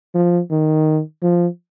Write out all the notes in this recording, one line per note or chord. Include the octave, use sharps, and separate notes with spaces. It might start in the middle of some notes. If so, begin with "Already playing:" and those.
F3
D#3
F3